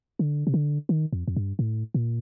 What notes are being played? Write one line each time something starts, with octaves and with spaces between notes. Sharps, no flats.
D3
C3
D3
D#3
F2
F2
G2
A2
A#2